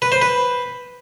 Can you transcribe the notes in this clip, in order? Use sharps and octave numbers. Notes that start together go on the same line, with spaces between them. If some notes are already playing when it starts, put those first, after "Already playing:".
B4
C5
B4